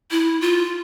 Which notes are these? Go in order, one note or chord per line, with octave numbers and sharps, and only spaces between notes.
E4
F4